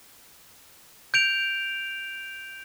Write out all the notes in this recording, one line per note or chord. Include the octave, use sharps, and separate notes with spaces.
G6 D7 F7